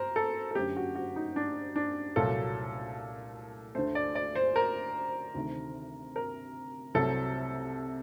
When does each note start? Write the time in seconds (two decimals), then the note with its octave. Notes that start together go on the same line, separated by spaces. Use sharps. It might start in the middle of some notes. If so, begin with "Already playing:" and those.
Already playing: A#4 C5
0.16 A4
0.51 A4
0.55 F#2 D3 A3 G4
0.76 F#4
0.95 F#4
1.16 D#4
1.36 D4
1.76 D4
2.16 C2 A#2 F#3 A3 A4
3.75 D2 D3 A3 C5
3.95 D5
4.15 D5
4.36 C5
4.56 A#4
5.35 D2 C3 D#3 A3
6.16 A#4
6.95 C2 C3 F#3 A3 A4